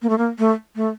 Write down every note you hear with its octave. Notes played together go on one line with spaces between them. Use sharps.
A#3
A3
A#3
A3
A3